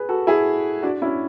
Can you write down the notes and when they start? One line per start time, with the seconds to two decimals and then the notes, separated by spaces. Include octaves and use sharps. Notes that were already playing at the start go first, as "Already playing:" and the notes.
Already playing: G#4 B4
0.09 F#4 A4
0.27 E4 G#4
0.82 D4 F#4
1.02 C#4 E4